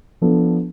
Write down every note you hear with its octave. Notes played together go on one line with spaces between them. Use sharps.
F3 B3 D4 A4